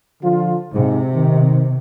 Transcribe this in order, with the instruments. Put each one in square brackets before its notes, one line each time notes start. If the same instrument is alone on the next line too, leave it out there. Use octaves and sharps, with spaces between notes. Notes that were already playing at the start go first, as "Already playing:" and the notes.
[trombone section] D3 F3 F4
[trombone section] G#2 [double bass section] C3
[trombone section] D#3